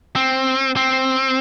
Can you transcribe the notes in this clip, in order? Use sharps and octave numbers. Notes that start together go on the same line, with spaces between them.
C4
C4